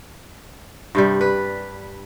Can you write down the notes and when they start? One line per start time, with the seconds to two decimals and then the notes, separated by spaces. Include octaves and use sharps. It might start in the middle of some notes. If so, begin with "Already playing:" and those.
0.95 G2 C3 G3
1.21 B4